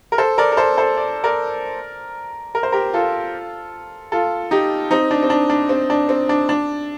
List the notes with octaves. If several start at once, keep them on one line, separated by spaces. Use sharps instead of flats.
A#4
A4 C5
A#4 D5
A#4
A4 C5
A4 C5
D5
A#4 D5
A#4
C5
G4 A#4
F4 A4
F4 A4
D#4 G4
C4 D#4
D4
C4
D4
D4
C4
D4
C4
D4
D4